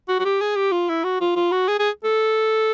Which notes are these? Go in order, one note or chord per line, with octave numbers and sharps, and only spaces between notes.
F#4
F#4
G4
G#4
G4
F4
E4
F#4
F4
F4
F#4
G#4
G#4
A4